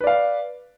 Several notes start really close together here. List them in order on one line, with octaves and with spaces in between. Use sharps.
B4 D5 F5